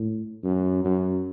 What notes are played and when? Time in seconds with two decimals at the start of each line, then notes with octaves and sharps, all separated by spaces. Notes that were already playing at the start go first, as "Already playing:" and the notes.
Already playing: A2
0.43 F#2
0.84 F#2